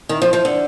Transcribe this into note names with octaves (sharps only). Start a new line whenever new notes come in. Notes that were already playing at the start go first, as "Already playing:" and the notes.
D#3
F3
F3
D3